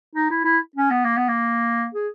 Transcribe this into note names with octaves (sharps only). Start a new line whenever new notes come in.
D#4
E4
E4
C#4
B3
A#3
B3
A#3
G#4